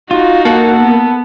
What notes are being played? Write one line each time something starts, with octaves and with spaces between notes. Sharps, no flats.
D#4 F4 F#4
A#3 A4 F#5
B3